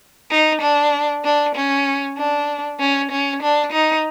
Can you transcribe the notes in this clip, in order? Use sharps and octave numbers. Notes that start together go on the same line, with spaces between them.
D#4
D4
D4
C#4
D4
C#4
C#4
D4
D#4